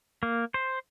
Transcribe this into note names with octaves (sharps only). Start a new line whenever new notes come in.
A#3
C5